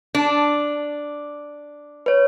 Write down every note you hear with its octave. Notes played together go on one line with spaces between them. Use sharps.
D4
B4 C#5